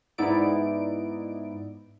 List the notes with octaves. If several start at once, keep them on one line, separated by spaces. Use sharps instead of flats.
G#2 B3 D#4 E4 D5 D7